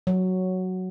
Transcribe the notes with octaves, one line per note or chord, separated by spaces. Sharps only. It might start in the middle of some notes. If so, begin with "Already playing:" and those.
F#3